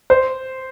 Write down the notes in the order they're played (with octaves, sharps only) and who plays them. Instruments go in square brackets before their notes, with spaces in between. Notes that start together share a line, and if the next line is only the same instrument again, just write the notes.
[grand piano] C5